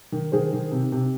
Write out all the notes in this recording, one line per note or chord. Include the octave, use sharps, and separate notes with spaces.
D#3
D#3 G#4 C5
D#3
C3
C3